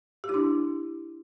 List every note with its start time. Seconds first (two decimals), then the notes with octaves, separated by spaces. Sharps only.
0.24 G4
0.29 E4
0.34 D4